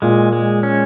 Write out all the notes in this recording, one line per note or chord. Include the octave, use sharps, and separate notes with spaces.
A#2 G#3
G#3
C#4